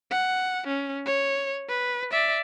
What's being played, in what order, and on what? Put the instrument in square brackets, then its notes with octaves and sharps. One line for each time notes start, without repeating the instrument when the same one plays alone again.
[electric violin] F#5
C#4
C#5
B4
D5 E5